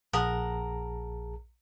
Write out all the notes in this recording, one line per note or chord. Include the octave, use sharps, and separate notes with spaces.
A#1 G#4 A#4 F#5 A5 D#6